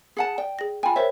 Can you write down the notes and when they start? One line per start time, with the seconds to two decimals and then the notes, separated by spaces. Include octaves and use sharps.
0.17 G#4 F#5 A5
0.38 D5 G5
0.59 G#4 A#6
0.83 F4 G5 G#5 B5
0.96 A#4 C5 C#5 E5